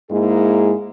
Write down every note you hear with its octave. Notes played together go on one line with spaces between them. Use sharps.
G#2 G#3 A#3 E4 G#4